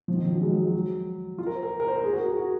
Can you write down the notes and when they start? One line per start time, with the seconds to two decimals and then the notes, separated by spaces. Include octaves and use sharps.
0.08 F3
0.16 D#3
0.25 F3
0.33 F#3
0.41 G#3
0.49 F#3
0.58 G#3
0.66 F#3
1.38 F4
1.47 A#4
1.55 C5
1.63 A#4
1.80 A#4
1.88 C5
1.96 A#4
2.04 G#4
2.13 F#4
2.20 A#4
2.28 G#4
2.37 F#4